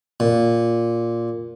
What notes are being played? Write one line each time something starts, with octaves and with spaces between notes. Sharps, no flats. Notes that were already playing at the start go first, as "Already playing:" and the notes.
A#2